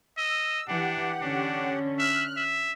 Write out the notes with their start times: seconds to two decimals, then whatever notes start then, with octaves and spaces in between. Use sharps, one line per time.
0.18 D#5 E6
0.68 E3 D4 G4 F#5
1.22 D3 C#4 D4
1.99 E5 F6 F#6
2.37 E5